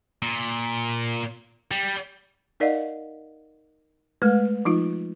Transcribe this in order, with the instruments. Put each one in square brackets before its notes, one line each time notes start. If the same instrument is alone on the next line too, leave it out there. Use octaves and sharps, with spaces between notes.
[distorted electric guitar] A#2
G3
[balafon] D#4 A#4 D5 D#5 F5 F#5
G#3 A3 B4
F3 D#4 F4